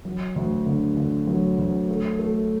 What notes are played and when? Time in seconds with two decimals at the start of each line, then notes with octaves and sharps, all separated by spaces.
0.05 F#3
0.36 D2
0.66 D3
0.97 D3
1.27 F#3
1.58 D2
1.88 A3
2.19 A3